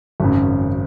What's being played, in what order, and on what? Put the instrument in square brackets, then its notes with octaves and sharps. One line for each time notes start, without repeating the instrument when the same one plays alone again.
[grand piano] G#1 F#2 C#3